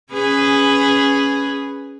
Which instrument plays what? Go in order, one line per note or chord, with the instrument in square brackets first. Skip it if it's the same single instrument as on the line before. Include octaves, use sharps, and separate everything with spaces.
[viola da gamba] C#4 G#4 B4